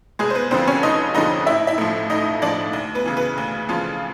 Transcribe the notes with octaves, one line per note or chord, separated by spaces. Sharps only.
F1 G#3 G#4
C5
B3 B4
F2 D3 F3 C4 C5
C#4 C#5
F1 D#4 D#5
F2 D3 F3 D#4 D#5
A1 E4 E5
E4 E5
A2 F3
A1 D#4 D#5
A2 F3 D4 D5
D2
B3 B4
C#3 E3
B3 B4
D2
C#3 E3 F3 F4